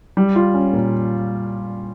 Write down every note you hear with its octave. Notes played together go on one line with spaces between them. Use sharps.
G3
F4
C#4
A#2